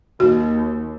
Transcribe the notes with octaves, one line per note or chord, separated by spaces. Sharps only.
D#2 F#4